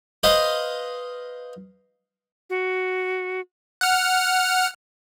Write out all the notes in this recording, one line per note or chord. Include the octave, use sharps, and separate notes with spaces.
B4 C5 D#5 F5
F#4
F#5 F6